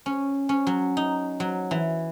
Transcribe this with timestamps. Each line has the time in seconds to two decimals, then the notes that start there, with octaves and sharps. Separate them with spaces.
0.06 C#4
0.49 C#4
0.67 F#3
0.97 D#4
1.40 F#3
1.71 E3